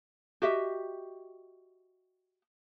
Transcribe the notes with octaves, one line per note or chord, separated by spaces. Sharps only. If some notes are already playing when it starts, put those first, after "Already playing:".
F#4 G4 D#5 E5